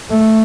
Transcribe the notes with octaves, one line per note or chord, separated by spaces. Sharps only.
A3